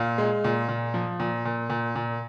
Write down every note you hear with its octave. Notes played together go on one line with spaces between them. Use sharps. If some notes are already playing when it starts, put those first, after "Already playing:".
Already playing: A#2 F5
G#3
A#2
A#2
F3
A#2
A#2
A#2
A#2